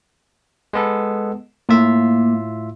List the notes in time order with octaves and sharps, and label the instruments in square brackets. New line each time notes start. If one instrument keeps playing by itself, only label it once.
[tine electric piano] G#3 B3 A4
[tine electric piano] A2 F4 E5 [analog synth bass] A#3